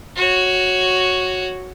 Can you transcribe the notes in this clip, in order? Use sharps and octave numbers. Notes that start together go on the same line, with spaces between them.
F#4 C#5